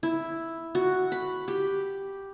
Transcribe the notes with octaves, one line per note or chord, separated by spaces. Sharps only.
E4
F#4
B5
G4